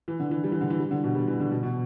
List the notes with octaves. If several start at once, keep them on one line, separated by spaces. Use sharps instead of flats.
E3
D3
E3
G3
E3
D3
E3
G3
D3
B2
G3
E3
D3
B2
B2